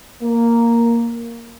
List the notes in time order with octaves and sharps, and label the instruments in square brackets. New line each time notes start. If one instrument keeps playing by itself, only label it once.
[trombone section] A#3